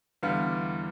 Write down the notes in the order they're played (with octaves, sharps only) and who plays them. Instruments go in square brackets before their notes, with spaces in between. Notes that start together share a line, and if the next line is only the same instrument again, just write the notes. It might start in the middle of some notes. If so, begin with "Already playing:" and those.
[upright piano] E2 D3 G3 B3 F5